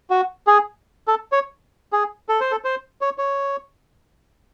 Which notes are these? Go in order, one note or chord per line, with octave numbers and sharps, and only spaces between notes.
F#4
G#4
A4
C#5
G#4
A4
C5
A4
C5
C#5
C#5